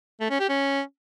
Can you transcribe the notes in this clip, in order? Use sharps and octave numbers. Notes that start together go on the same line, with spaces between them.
A3
C#4
G4
C#4